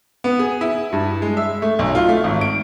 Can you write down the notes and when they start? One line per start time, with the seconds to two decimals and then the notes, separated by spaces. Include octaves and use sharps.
0.24 B3
0.39 G#4
0.61 E4
0.93 G2
1.22 G#3
1.37 E5
1.62 A3
1.79 B1
1.95 F4
2.09 A3
2.24 G#1
2.41 D7